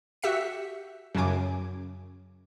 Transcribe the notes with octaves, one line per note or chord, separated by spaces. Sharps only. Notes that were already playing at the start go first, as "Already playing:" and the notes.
F#4 G4 E5 B6 C#7
F#2 C#3 C#4 G#5 D6